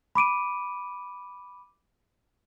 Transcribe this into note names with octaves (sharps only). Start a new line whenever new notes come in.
B5 D6 D7 D#7